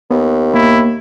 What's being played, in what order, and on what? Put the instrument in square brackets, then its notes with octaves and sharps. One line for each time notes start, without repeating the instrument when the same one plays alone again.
[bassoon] D#2 [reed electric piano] B3
[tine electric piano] A#3 [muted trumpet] E4